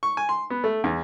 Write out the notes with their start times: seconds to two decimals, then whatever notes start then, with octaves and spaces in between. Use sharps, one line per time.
0.03 C#6
0.17 G#5
0.29 C6
0.50 B3
0.64 A3
0.84 E2